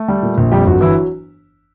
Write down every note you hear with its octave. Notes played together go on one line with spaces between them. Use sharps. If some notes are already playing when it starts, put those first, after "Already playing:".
Already playing: A3 A4
G3
A#2
A#1
F2 G3 G4
G1 F#3 F#4
E3 F#3 E4